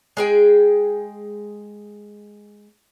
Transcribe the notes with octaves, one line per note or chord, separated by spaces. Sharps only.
G#3 G#4 G5